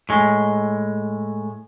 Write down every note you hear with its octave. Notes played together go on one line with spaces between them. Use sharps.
A2 G#3